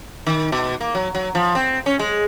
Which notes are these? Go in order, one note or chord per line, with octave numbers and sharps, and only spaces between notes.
D#3
B2
A#3
F#3
F#3
F3
C4
C#4
G#3